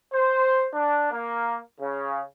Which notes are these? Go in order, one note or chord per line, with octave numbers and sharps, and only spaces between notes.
C5
D4
A#3
C#3